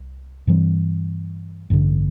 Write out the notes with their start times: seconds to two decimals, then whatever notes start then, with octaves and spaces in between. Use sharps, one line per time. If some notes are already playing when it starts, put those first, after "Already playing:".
Already playing: C2
0.47 G2 E3 G3 C4
1.70 A1 G2 D3